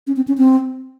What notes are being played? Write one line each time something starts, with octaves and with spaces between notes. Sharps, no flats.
C#4
C4
C#4
C4